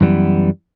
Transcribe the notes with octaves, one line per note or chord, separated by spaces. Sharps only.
F#2 E3 G3 B3